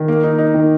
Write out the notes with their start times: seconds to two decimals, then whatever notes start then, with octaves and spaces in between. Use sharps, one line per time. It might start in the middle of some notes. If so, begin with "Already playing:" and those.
Already playing: D#3
0.08 A#3
0.24 D#4
0.38 D#4
0.54 D#3